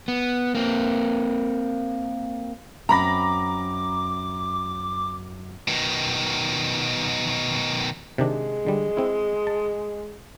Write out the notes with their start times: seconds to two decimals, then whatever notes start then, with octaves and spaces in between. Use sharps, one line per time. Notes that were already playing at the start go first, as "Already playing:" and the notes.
0.08 B3
0.55 A#3 C4
2.89 F#2 C4 A#5 B5 D6 A#6
5.68 B2 D#3
8.18 C3 D#3 G#3 D4
8.67 D3 G3
8.97 C4 E4
9.47 A5